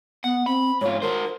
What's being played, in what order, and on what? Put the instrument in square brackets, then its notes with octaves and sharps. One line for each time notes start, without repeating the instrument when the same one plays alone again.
[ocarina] B3 [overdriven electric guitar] F#5
[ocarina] C4 [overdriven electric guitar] B5
[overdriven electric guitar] G#2 F4 [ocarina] C#5
[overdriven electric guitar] F#4 C5 [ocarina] A#4